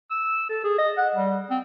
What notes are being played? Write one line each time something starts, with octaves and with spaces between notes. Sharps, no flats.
E6
A4
G#4
D#5
F#5
G3
C4